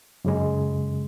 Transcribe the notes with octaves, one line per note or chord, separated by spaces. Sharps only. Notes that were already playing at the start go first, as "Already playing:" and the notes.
F#2 C#3 G#3